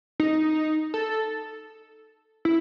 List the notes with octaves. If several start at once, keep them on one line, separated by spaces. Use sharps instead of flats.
D#4
A4
E4